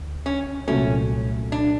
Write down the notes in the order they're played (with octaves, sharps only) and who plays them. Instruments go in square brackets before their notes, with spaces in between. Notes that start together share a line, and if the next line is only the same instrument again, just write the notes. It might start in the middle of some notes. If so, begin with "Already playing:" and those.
Already playing: [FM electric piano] D2
[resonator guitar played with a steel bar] C#4
[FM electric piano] C2 A#2 F#3 A3 [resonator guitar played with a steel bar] C#4
[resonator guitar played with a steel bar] D4